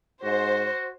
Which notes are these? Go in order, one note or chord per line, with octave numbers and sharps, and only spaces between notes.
G#2 F#4 C5